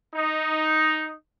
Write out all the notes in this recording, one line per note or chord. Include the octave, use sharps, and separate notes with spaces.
D#4